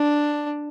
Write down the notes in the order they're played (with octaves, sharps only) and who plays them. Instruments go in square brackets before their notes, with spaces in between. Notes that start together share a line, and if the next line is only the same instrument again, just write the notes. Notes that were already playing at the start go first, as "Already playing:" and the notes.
Already playing: [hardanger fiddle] D4